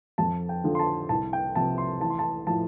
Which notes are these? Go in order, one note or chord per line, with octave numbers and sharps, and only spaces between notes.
F2 A5
G5
D3 F3
C6
A5
C2 A5
G5
C3 F3 A5
C6
A1 A5
C6
A5
A2 F3 A5